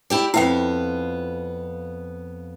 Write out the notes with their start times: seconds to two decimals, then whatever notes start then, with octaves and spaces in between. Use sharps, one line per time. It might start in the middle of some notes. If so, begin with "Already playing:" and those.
0.10 E4 G4 D5
0.34 F2 B3 E4 E5 F5 G5